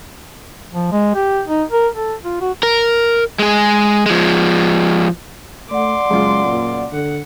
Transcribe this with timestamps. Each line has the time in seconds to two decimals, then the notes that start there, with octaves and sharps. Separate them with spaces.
0.74 F3
0.92 G#3
1.15 G4
1.47 D#4
1.71 A#4
1.95 A4
2.24 F4
2.41 F#4
2.63 A#4
3.39 G#3 G#4
4.06 F3 G#3
5.71 A3 D5 F#5 C6 D6
6.10 F#1 F#2 G#3 F4
6.45 A#2
6.92 D3 F#5